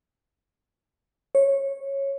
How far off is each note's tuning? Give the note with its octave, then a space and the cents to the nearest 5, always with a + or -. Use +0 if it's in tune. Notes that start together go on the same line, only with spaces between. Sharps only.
C#5 -15